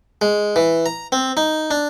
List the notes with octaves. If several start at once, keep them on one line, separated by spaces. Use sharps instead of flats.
G#3
E3
A#5
C4
D#4
D4